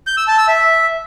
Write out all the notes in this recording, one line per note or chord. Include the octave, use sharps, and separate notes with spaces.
G6
E6
A5
E6
E5